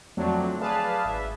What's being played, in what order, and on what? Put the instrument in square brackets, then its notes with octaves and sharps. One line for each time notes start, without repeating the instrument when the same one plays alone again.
[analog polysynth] F2 D3 F#3 A3 C4 D4
G#4 B4 D5 F5 A5
G#1 E5